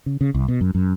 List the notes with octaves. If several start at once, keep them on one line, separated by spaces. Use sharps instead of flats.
C#3
C#3
C2
B2
F#2
F#2